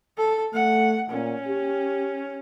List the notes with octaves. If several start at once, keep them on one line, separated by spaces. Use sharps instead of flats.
A4
A3 F#5
A#2 C#4
G4